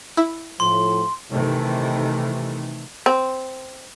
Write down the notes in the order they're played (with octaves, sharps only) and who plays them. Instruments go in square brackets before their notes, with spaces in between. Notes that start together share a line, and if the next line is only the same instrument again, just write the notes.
[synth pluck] E4
[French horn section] A2 F3 [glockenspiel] C6
[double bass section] C3 D#3 E3 A3
[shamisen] C4